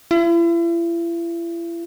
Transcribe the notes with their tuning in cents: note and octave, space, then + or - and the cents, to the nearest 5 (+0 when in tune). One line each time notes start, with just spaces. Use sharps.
E4 +40